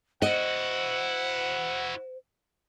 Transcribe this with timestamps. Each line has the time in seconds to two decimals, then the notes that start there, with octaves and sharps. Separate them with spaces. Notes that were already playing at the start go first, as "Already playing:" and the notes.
0.22 E4 F#4 C5 D#5 F#5